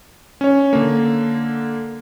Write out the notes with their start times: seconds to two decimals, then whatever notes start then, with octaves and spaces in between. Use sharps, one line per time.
0.41 C#4 C#5
0.73 D3 A#3